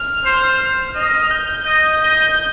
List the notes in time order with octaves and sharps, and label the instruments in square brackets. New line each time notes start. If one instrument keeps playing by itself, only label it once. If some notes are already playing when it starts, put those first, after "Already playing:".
Already playing: [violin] F6
[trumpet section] C5
[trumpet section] D#5 [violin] F6
[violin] G6
[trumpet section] D#5
[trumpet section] D#5 [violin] G6